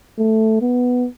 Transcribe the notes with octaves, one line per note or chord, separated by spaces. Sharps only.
A3
B3